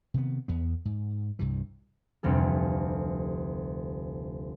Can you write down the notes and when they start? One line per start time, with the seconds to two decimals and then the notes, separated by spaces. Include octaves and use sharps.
0.14 C3 D#3 B3
0.48 E2 B3
0.85 G#2
1.39 C2 G2 C3 E3
2.23 F1 D2 G3 A4